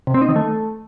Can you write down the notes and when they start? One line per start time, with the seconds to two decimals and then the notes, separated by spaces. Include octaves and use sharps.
0.07 C3
0.14 C4
0.21 D#4
0.29 D#3
0.36 A3